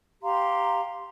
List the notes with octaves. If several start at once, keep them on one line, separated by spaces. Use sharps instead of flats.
G4 F5 A#5 C6